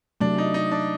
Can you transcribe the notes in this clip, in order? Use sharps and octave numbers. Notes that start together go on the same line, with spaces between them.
C3 F#3 A3 D4
D#4
D#4
D4